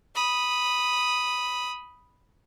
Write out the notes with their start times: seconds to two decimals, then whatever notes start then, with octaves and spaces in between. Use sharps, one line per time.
0.15 B5 D#6